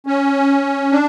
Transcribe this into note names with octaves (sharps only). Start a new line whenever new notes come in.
C#4
D4